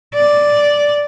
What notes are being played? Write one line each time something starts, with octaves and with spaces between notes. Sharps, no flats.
D5